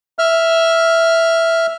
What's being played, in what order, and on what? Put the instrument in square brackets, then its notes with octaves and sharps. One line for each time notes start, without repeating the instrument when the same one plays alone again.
[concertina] E5 F6